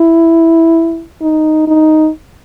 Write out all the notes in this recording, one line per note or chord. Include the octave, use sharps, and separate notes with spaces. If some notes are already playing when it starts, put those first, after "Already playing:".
Already playing: E4
D#4
D#4